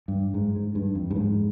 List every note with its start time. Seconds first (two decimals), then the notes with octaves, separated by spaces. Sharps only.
0.08 G2
0.34 G#2
0.56 G#2
0.75 G2
0.95 F2
1.11 G2
1.16 G#2